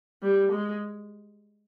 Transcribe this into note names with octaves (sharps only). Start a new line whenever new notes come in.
G3
G#3